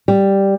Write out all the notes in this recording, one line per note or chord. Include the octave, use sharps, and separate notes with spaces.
G3